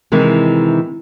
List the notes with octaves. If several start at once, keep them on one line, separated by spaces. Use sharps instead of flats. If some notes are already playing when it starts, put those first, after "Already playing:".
C3 D#3 E3 G#3